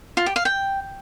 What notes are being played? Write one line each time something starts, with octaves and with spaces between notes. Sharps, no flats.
F4
G4
F5
G5